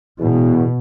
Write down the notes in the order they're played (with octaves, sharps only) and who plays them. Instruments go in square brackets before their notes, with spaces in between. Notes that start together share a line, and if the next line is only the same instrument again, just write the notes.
[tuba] E2 [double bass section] B2